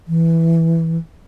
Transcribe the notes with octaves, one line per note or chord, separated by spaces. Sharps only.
E3